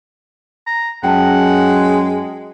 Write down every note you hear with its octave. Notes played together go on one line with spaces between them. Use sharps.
A#5
F#2 G#3 F#5 G5 A5